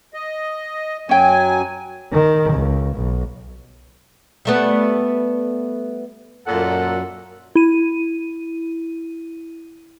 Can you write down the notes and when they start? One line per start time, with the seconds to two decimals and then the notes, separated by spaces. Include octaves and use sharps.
0.14 D#5
1.09 F#2 F#3 C#4 G5 G#5
2.12 D#3
2.52 C#2
2.95 B1
4.45 G3 A3 B3
6.47 F#2 A#2 A4 F#5
7.56 E4 D#7